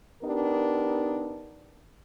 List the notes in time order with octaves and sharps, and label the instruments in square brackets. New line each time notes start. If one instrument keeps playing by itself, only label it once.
[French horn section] B3 D4 D#4 G4 A#4